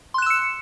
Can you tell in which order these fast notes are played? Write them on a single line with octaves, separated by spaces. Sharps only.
C6 F#6 E7 E6 C#7